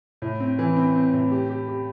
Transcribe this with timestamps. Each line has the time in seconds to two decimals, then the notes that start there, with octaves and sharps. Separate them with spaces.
0.22 A2
0.40 C4
0.59 E3
0.76 C4
0.95 C4
1.14 A2
1.31 G4
1.50 G4
1.68 G4